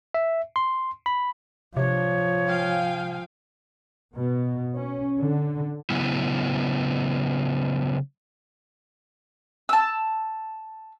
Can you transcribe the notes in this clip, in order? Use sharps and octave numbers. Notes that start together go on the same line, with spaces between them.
E5
C6
B5
C3 F3 D4 C#5
F5 G5 G#5
B2
C#4
D3
C#3 F#3 B3 E4
A5 E6